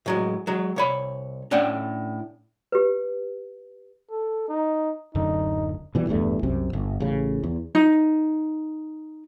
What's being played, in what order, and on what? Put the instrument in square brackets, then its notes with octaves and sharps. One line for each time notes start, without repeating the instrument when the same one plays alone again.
[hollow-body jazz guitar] A2 F#3 G#3
F#3 G#3
C2 C#5 B5
A2 C#4 D4 F#5 G5
[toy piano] G4 B4
[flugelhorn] A4
D#4
[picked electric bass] D1 F#2 D3 [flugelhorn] D#4
[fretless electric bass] B2 E3 G3
D1 E2 G2 A3
C2 F#2 C3 C4
G1
A1 C#3
E2
[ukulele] D#4